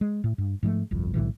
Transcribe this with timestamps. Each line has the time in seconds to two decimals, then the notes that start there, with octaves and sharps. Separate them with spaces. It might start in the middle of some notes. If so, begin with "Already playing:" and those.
0.01 G#3
0.24 A2
0.38 G2
0.63 G#2 F3 G#3 A3
0.91 G1 C2 F2
1.14 B1 A2 D3 E3